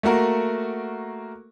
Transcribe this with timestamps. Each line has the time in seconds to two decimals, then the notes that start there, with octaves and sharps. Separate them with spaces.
0.03 A3 A#3 F#4 A#4